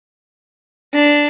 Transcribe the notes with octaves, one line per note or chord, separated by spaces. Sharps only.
D4